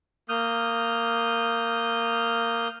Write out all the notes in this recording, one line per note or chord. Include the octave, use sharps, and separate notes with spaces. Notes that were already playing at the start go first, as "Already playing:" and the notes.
A#3 D#6 F6 G6